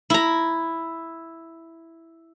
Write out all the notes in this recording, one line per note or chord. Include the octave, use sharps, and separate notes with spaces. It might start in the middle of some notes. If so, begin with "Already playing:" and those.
E4 A#5